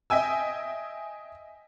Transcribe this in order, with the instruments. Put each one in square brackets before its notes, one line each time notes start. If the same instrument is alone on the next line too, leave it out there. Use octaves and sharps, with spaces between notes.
[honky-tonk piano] D#5 E5 G5 G#5 E6